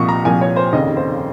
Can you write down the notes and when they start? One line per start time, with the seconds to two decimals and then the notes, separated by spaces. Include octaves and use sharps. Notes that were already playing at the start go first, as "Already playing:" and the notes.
Already playing: C2 A#2 F3 C#6 D#6
0.09 A#5
0.25 C2 A#2 F3 G#5
0.41 C#5
0.56 C5
0.73 F1 D#2 C#3 D#5
0.97 C5